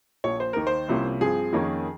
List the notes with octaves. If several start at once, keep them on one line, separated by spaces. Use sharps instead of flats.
A#1 A#2 F3 C#5
C5
D#2 D#3 A#3 D#4 A#4
C5
C2 C3 F3 A#3 C#4
G2 F3 C4 G#4
F2 D#3 A#3 C#4